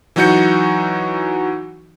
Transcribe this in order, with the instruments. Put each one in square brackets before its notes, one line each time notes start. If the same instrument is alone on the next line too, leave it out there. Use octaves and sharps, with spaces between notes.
[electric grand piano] E3 F#3 D#4 F#4 G6 C#7